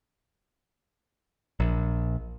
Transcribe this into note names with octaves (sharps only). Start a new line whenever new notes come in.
A#1